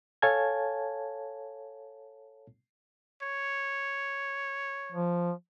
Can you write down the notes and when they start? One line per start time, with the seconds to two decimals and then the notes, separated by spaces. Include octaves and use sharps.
0.22 A4 C#5 F5 G#5 A5 G#6
3.22 C#5
4.92 F3